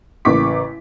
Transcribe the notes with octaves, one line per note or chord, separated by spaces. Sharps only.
A1 C#3 A#3 C#6 D6 B6